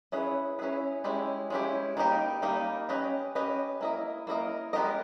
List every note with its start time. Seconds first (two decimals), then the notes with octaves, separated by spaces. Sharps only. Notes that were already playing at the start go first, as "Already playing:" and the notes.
0.12 C#4 E4 G#4 B4
0.59 C#4 E4 G#4 B4
1.04 G#3 C#4 E4 G4
1.50 G#3 C#4 E4 G4
1.97 D#3 G3 A#3 D#4 G4
2.42 D#3 G3 A#3 D#4 G4
2.89 C#4 G4 B4 D#5
3.35 C#4 G4 B4 D#5
3.81 A#3 E4 A#4 D#5
4.27 A#3 E4 A#4 D#5
4.73 G#3 B3 G4 A#4 D#5